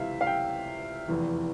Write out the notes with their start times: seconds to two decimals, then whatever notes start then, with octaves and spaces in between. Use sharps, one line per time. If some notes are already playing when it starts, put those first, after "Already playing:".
Already playing: C#2 C3 E3 E5 F5
0.21 F5
0.27 G5
1.08 F1 E2 E3